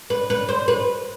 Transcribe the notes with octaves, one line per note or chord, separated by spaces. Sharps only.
B4
B4
C5
B4